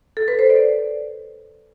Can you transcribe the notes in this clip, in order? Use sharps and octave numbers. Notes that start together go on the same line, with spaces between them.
A4
B4
C5
D5